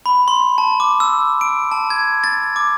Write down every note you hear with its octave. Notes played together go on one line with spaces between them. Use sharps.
B5
C6
A5
D6
E6
D7
A5
G#6
A6
D6